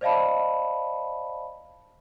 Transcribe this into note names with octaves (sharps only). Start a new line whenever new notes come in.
C5 D5 D#5 F5 A5 B5